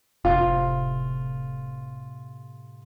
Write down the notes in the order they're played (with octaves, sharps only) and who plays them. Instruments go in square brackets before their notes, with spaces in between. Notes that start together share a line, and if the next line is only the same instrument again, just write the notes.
[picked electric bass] F1 [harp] A2 C3 C4 [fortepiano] F4